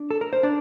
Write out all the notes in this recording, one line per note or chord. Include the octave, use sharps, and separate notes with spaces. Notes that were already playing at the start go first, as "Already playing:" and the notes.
Already playing: D4 D5
A4
A#4
C5
D4 D5